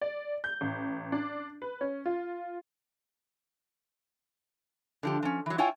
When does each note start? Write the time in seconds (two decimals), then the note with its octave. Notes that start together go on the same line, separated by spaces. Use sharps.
0.01 D5
0.44 G6
0.61 A1
1.12 D4
1.62 B4
1.81 C#4
2.06 F4
5.03 D3 F3 G4
5.23 F3 C#4
5.46 E3 F#3
5.58 E4 F4 C#5 G5 G#5